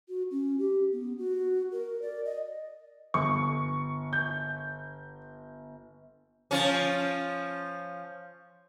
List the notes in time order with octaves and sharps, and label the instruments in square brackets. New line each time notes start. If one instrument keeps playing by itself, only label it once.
[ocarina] F#4
C#4
G4
B3
F#4
A#4
D5
D#5
[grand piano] G1 [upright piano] C#6
[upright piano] G6
[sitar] F3 C#4